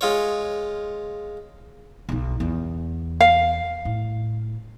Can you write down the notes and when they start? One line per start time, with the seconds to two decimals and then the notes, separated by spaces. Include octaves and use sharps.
0.01 G#3 F4 C#5
2.09 B1 D#4
2.40 E2
3.20 F5
3.85 A2